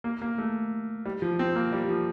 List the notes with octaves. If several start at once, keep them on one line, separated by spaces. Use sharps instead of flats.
A#3
A#3
A3
G3
F3
C4
A#3
G3
F3